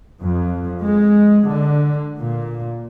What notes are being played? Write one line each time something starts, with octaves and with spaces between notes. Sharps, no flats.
F2
G#3
D3
A#2